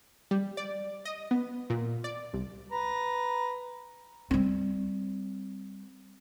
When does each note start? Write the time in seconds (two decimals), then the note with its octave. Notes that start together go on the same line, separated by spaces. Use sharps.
0.31 G3
0.57 D5
1.05 D#5
1.31 B3
1.70 A#2
2.04 D5
2.33 C2
2.72 B4 A#5
4.31 G3 C4